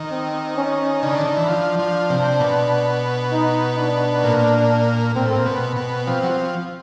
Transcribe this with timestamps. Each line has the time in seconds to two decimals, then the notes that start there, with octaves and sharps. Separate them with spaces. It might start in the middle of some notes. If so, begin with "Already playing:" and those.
Already playing: D#3
0.11 C4
0.57 C#4
1.03 C#3 D4
1.14 D3
1.26 D#3
1.37 E3
1.48 F3
1.79 F3
2.10 C3
2.40 B2
3.32 D#4
3.78 D4
4.24 A#2
5.16 A#2 C4
5.25 A2
5.35 A#2
5.46 B2
5.77 B2
6.07 F3 C4
6.23 F#3
6.31 F3